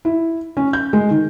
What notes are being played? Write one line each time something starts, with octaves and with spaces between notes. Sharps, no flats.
E4
C#4
G6
G#3
D#3